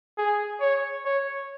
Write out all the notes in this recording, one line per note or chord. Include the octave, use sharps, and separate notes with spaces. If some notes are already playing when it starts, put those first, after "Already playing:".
G#4
C#5
C#5